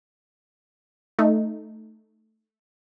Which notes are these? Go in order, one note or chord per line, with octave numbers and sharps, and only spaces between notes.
A3 D#4